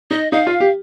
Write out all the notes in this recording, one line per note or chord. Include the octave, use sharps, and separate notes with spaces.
D#4 D#5
D#4 F5
F4
G4